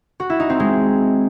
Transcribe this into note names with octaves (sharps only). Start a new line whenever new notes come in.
F#4
E4
D#4
C4
G#3